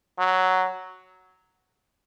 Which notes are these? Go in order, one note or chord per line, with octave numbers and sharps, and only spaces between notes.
F#3